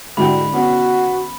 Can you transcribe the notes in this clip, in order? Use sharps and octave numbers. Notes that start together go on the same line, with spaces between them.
G#2 D3 G3 E4 F#4 G5 B5
B3 C#4 F#4